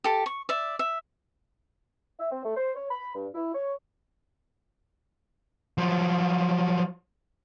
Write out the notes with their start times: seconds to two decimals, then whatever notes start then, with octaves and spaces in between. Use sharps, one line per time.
0.04 G4 A4
0.26 C#6
0.49 D5 E5
0.79 E5
2.20 E5
2.31 C4
2.45 A3
2.57 C5
2.76 C#5
2.91 B5
3.15 G2
3.34 E4
3.55 C#5
5.78 F3 F#3